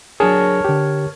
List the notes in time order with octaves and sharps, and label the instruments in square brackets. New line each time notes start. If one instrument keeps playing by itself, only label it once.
[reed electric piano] F#3 D4 G#4 [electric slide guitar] A#4 C#5 A5
[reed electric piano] D3 G4